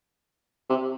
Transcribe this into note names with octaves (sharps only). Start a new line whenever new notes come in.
C3